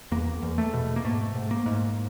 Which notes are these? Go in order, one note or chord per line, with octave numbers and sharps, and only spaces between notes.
E2 A#3
E2
A3
B2
A#3
G#2 A3
G#2
A#3
G#2